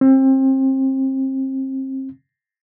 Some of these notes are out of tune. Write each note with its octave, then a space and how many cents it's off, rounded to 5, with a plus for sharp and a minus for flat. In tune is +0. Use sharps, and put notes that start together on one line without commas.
C4 +30